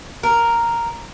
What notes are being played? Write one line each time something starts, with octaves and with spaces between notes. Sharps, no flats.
A#4